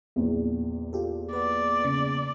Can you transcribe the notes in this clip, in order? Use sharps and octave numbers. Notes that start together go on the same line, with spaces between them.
A#1 E2
F4 G4 A4
B4 D5 F#5
C#3